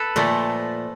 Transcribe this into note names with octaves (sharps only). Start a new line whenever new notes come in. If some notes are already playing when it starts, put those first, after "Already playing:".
Already playing: A4 B4
A#2 F3 A3